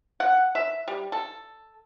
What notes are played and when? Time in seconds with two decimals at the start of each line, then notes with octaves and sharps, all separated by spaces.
0.20 F#5
0.55 E5
0.88 G3
1.12 A4